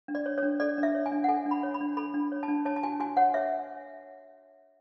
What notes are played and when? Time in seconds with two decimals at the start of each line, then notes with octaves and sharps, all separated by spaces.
0.08 D4
0.15 D5
0.26 C#5
0.38 D4 C#5
0.60 A4 D5
0.78 D4
0.83 E5
0.95 C#5
1.06 G#5
1.12 D4
1.24 F#5
1.28 A4 G#5
1.45 D4
1.51 B5
1.63 C#5
1.74 B5
1.81 D4
1.97 A4 B5
2.14 D4
2.32 C#5
2.43 A5
2.48 D4
2.65 C#5 A5
2.76 A5
2.83 F#4 G#5
3.00 F#4 G#5
3.17 C#5 F#5
3.34 C#5 E5